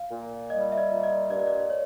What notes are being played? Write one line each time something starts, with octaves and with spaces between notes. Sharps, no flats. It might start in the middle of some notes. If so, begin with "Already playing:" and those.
Already playing: F5
A#2
G3 D#5
E5
D#5
A#2
D#5
G2 D5
D#5
D5
C#5